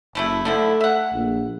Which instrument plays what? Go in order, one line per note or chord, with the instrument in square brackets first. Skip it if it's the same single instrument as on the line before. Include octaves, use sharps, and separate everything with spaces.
[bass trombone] F#1 [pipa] E3 A3 E4
[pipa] D3 F3 E4 [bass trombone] A3
[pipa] E5 F#5
[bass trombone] A#1